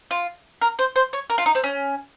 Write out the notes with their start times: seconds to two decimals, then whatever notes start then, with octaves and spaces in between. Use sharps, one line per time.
0.11 F4
0.61 A#4
0.79 C5
0.96 C5
1.13 C#5
1.30 A#4
1.38 F4
1.46 D#4
1.55 C4
1.64 C#4